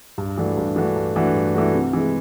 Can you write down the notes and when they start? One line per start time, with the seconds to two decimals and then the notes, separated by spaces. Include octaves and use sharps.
0.18 G2
0.38 E3 A3 D4 F#4
0.57 G2
0.76 E3 A3 D4 F#4
0.96 G2
1.16 E3 A3 D4 F#4
1.35 G2
1.54 E3 A3 D4 F#4
1.74 C3
1.93 E3 G#3